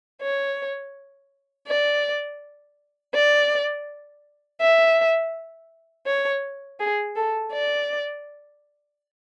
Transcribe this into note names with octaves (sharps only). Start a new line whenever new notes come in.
C#5
D5
D5
E5
C#5
G#4
A4
D5